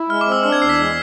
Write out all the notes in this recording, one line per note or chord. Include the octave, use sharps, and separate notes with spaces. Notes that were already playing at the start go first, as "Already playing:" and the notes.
Already playing: E4
G#3 F6
D6
C4
E6
D4 F6
G#6
E2 C7
B6
G#3